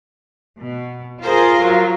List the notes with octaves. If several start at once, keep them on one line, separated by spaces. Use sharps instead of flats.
B2
F4 G#4 A#4 C5
F#3